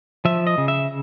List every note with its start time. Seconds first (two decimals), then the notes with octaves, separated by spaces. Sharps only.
0.25 F3 E5
0.47 D#5
0.58 C#3
0.68 E5